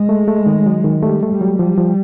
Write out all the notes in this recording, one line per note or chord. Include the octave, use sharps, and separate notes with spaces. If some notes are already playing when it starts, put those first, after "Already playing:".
Already playing: G#3
A3
A3
D#3
F#3
D#3
G3 A3
A3
G3
F#3
F3 G3
F3